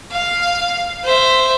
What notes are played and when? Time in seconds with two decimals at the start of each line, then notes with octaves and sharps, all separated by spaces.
0.11 F5
1.04 C5 E5